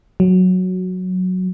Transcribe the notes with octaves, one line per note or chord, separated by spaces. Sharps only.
F#3